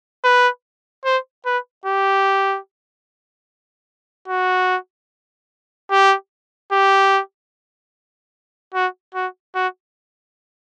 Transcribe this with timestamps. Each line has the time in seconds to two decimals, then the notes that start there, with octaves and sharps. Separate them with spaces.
0.24 B4
1.05 C5
1.46 B4
1.86 G4
4.28 F#4
5.91 G4
6.72 G4
8.74 F#4
9.15 F#4
9.55 F#4